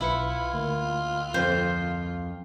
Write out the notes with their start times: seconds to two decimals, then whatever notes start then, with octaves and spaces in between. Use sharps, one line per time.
0.01 B1 E4 F4 B4 C#7
0.54 D2 A#3
1.34 F2 C5